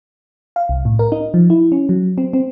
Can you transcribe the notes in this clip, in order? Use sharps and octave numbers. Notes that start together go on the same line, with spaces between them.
F5
C2
A2
A#4
D#4
F3
E4
C#4
F#3
C4
C4